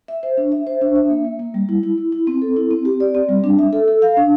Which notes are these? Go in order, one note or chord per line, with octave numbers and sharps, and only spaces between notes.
E5
C5
D4
E5
C5
D4
E5
A#3
A#3
A#3
G3
E4
E4
E4
E4
C4
A4
E4
C4
G4
D5
C4
G3
D4
E5
A4
A4
F5
D4